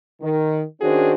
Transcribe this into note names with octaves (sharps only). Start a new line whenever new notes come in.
D#3
D#3 C#4 D4 F#4 G#4 C5